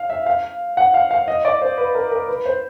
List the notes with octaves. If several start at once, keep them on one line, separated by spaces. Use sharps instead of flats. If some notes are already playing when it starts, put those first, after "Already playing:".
Already playing: F5
E5
F5
F#5
F5
F5
D#5
D5
C5
B4
A#4
A#4
B4
C5